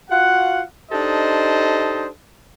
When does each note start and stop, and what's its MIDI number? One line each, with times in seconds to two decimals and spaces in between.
0.10 0.61 65
0.10 0.61 66
0.10 0.61 77
0.10 0.61 78
0.92 2.08 62
0.92 2.08 63
0.92 2.08 67
0.92 2.08 69
0.92 2.08 72
0.92 2.08 75